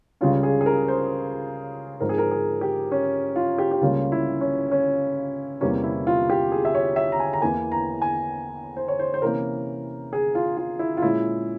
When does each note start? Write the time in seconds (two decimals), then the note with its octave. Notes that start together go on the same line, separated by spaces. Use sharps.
0.21 C#2 C#3 G3 C#4 F4
0.43 G#4
0.61 G#4
0.66 A#4
0.88 C5
2.00 G#2 F3 C4 A#4
2.09 G#4
2.18 A#4
2.31 G#4
2.61 G4
2.91 C#4
3.36 F4
3.58 G4
3.72 G4
3.81 C#2 C#3 G3 A#3 C#4 F4
4.12 E4
4.41 C#4
4.71 C#4
5.61 E2 C3 G3 A#3 C#4
5.83 E4
6.07 F4
6.30 G4
6.52 G#4
6.65 E5
6.75 C#5
6.96 E5
7.12 A#5
7.20 G#5
7.33 A#5
7.41 E2 E3 A#3 G#5
7.72 A#5
8.02 G#5
8.77 C5
8.88 C#5
8.99 C5
9.14 C5
9.22 C3 E3 A#3 C#4 A#4
10.13 G#4
10.35 F4
10.57 F4
10.79 E4
10.97 F4
11.02 A#2 G#3 C#4 E4